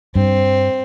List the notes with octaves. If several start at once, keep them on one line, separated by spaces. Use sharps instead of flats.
G2 C4